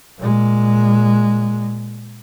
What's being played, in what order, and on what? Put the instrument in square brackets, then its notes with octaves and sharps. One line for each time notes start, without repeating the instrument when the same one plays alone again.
[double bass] A#2 G#3